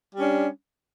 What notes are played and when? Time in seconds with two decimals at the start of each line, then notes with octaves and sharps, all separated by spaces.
0.15 G3
0.18 C#4
0.22 D4